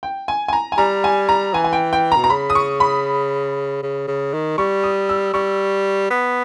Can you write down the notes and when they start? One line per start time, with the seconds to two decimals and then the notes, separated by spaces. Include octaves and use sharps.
0.03 G5
0.28 G#5
0.48 G#5
0.53 A#5
0.72 G#5
0.78 G3 A#5
1.04 G#5
1.29 A#5
1.54 E3 G#5
1.64 G#5
1.73 G5
1.93 G5
2.12 A#5
2.16 B2
2.24 A#5
2.30 C#3 B5
2.50 D#6
2.55 C#6
2.80 B5
3.83 C#3
4.08 C#3
4.33 D#3
4.58 G3 C#6
4.83 D#6
5.09 E6
5.34 G3 C#6
6.11 B3